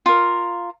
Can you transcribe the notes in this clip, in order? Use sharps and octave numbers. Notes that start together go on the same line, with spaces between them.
F4 A#4